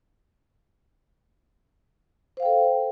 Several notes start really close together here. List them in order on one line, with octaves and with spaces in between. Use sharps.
C5 F5 G5 A4